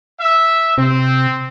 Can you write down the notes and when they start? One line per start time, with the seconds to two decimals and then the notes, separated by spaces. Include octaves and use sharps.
0.20 E5
0.78 C3 C4